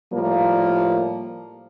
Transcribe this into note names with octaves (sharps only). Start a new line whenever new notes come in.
A2 F3 G3 A#3